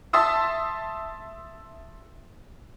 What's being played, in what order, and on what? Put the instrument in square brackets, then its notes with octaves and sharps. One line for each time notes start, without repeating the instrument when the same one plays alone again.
[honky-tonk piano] E5 A5 C6 D#6 E6